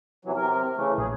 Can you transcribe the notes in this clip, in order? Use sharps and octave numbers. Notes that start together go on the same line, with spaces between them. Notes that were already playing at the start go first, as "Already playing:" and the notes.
C3 E3 F#3
C3 A#4
C#3 E3 A3
A#1 G#4